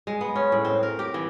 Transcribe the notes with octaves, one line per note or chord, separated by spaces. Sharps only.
G#3
B3
C#4
A2
C4
A#4
G4
E3